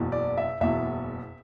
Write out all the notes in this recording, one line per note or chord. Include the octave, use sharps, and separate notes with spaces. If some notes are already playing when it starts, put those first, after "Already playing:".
Already playing: F#1 E2 B2
D5
E5
F#1 E2 B2 E5